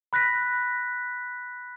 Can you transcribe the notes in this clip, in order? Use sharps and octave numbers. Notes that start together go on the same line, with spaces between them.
B5 F#6 A#6 B6